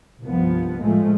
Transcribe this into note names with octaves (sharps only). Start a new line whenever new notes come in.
C2 G2 F3 B3
A2 F3 G#3 A3